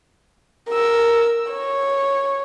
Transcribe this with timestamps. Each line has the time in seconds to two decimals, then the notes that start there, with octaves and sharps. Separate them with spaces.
0.69 A#4 E6
1.52 C#5